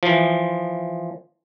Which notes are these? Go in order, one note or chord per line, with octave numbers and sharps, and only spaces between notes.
E3 F3